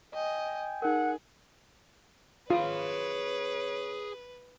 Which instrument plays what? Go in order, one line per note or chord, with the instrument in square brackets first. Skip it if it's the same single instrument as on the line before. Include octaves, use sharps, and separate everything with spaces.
[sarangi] D#5 [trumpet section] G5 G#5
[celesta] D#4 A#4 [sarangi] G#4 [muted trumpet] F#5
[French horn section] F#2 C#5 [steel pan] F4 [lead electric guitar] G#4 B5 [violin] B4